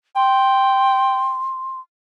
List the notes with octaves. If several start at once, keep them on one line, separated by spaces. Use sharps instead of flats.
G5 C6